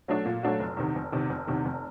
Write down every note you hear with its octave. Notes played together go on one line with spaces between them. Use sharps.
F#3 A3 D4 F#4
A#2
F#3 A3 D4 F#4
F1
E2 C3 D#3
F1
E2 C3 D#3
F1
E2 C3 D#3
F1